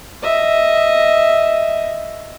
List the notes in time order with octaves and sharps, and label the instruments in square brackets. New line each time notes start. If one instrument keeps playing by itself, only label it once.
[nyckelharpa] D#5 E5